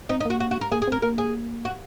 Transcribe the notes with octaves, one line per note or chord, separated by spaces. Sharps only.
C4 D#4
D#4
A#3 F#4
F#4
F#4
A#4
A#3 G#4
G#4
C4 A#4
A#3 A#4
G#4
F#4